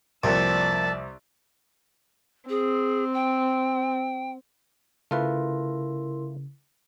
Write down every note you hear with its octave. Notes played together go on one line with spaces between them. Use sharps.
C2 F2 A#2 D5 E5 A5
C4 G#4
G5
C#3 A3 E4 F4 A#4 B4 C6